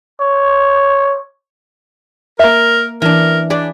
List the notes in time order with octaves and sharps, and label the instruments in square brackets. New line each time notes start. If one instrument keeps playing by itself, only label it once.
[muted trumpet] C#5
[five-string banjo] A#3 E5 [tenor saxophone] A#4
[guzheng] E3 D4 [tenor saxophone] A#4
[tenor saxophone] D4 [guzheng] G#4 B4 D5